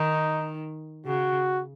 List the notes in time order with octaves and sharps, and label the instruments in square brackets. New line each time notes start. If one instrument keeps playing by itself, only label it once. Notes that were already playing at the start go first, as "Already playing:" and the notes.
Already playing: [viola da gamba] D#3 [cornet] D#4
[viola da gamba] C#3 [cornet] F#4